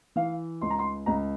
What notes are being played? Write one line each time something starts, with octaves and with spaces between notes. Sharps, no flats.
E3 F5
C#2 C6
A#5
C6
C#2 A#5